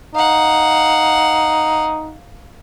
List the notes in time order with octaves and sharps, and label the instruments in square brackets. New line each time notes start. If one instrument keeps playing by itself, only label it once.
[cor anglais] D#4 [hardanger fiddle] F5 F#5